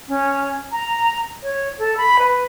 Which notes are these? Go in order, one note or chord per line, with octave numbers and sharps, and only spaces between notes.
C#4
A#5
C#5
A4
B5
B4